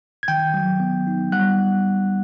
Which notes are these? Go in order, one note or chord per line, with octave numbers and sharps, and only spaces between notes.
G#6
D#3 G5 G6
F#3
B3
D#4
G3 F#5 F#6